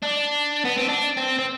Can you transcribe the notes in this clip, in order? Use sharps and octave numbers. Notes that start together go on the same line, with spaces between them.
D4
B3
C4
D4
C4
C4